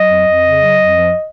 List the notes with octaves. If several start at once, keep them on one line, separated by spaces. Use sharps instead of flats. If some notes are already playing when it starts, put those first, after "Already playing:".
Already playing: F#3 D#5
F2
F2
C#3
F#3
F2
F3